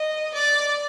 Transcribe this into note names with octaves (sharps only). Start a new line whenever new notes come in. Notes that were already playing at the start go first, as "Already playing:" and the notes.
Already playing: D#5
D5